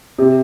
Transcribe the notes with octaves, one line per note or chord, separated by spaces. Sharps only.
C3